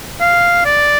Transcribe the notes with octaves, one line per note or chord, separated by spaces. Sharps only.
F5
D5